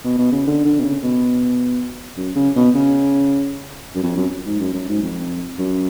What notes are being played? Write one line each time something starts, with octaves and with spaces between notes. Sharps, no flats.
B2
B2
C#3
D3
D3
B2
C#3
B2
F#2
C#3
B2
C#3
F#2
F2
F#2
G#2
F#2
F#2
G#2
F2
F#2